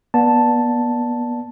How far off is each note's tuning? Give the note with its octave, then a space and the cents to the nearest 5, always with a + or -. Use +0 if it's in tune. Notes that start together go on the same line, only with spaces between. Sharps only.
B3 -35 D5 +0 A5 +0